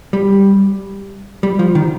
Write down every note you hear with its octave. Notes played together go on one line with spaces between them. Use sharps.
G3
G3
F3
D#3